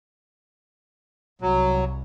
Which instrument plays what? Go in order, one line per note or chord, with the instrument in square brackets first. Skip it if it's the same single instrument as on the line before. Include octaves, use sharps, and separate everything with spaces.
[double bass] C2 [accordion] F#3